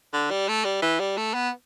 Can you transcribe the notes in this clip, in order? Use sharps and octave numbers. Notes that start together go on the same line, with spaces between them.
D3
G3
A3
G3
E3
G3
A3
B3